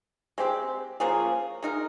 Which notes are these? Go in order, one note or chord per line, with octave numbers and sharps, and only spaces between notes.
G#3 C4 G4
F3 A#3 C#4 G#4
G#3 D#4 A#4